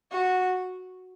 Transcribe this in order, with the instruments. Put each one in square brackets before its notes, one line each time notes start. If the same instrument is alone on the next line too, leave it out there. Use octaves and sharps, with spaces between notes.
[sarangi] F#4